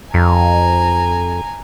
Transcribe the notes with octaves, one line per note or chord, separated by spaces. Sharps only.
F2 G#5 A#5